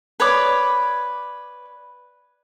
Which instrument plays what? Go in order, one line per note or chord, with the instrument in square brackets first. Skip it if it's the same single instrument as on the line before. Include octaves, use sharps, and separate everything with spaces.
[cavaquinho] B4 C#5 D5 D6